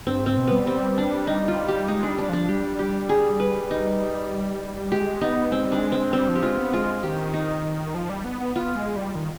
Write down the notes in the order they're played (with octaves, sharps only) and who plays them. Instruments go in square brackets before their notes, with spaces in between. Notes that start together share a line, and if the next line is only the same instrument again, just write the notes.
[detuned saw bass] G2 [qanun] C4
[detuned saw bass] G#2
[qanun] C4
[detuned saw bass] B2
[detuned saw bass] G3 [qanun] B3
[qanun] C4
D4
D#4
F4
G4
[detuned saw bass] G#3 [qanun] D#4
[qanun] D4
[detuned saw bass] G3
[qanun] D4
[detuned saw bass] F3 [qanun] D4
[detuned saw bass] G3 [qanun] G4
[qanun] G4
G#4
B4
D#4
[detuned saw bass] G#3 [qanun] G4
[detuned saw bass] B3 [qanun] D#4
[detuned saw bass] G#3 [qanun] C4
[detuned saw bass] G3
[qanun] D4
[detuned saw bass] G#3
[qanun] C4
[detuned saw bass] G3 [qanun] C4
[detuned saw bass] F3
[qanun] G4
[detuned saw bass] G#3 [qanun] F4
[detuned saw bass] B3
[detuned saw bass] G#3 [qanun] F4
[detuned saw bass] D#3 [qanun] G4
[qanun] D#4
[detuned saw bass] F3
G3
B3
B3
[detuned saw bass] B3 [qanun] F4
[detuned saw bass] G#3
G3
D#3